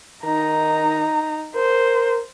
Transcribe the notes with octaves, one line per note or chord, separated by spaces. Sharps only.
D#3 D#4 A#5
A#4 C5